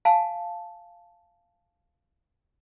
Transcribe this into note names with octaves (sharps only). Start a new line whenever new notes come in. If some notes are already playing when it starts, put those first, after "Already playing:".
F5 G#5 A5